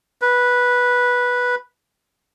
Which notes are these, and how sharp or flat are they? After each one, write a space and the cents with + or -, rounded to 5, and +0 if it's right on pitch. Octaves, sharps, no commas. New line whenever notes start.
B4 -10